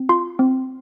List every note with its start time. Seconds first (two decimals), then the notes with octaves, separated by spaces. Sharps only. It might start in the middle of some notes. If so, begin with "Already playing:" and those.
Already playing: C4
0.09 F4 C6
0.39 C4